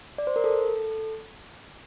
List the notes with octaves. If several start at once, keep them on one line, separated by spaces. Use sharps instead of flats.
D5
C5
A#4
A4